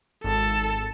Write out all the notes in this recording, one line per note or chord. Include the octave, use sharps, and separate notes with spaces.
G#1 A4 A5